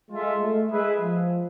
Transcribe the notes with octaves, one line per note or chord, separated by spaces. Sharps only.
G#3 F4 A4 E5
A3
G#3 E4 G#4 B4 E5
F3